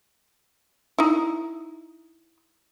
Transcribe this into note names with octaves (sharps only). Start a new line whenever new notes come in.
D#4 E4